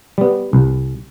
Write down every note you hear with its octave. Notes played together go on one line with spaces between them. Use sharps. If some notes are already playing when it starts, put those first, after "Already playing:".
G3 B3
C2